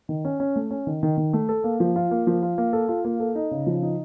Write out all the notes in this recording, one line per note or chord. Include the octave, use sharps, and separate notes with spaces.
D#3
C#4
C#4
A3
C#4
D#3
D#3
D#3
A3
A4
A#3
F3
F4
A#3
F3
F4
A#3
A4
F4
A#3
A4
D#4
C#3
F3
D#4